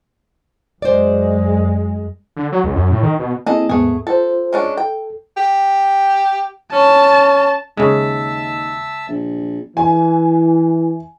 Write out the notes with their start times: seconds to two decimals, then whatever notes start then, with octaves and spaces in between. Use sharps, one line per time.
0.82 F#2 G#3 C5 D5
2.37 D3
2.52 F#3
2.64 C#2
2.76 F#2
2.91 A2
3.03 D#3
3.19 B2
3.46 A#3 C4 E4 G#4 A4 D#5
3.69 D#2 G#2 A3 B3 G#4
4.07 F4 A4 C5
4.53 G#3 C#4 D4
4.77 A4 G5
5.37 G4
6.73 C#4 A5
7.77 D#2 C#3 G#3 E5 A5 E6
9.09 A#1
9.77 E3 G#5